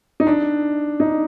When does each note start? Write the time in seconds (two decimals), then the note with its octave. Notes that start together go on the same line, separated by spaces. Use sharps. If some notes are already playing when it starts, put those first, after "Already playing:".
0.20 D#4
0.27 D4
1.00 D#4